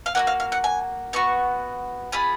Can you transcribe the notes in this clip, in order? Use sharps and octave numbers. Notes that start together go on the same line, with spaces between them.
F5
A#3 D#4 F#4 F#5
F5
F5
F#5
G#5
B3 F#4 C#6
B3 F4 G#4 B5